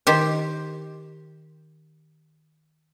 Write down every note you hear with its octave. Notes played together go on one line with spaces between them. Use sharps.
D#3 G4 C5